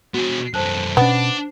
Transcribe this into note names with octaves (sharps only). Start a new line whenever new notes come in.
B2 F#4 G#4
F#2 A3 C5 A5 F#6
B2 B3 C#4 D4